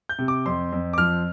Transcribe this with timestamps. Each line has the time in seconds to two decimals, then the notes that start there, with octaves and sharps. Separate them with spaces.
0.09 G6
0.19 C3
0.28 D6
0.46 F2 C6
0.72 F2
0.93 D6
0.98 F3 F6